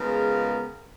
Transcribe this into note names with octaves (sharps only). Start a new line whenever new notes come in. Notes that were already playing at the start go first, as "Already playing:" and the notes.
Already playing: C#3 G#3 B3 F4 A#4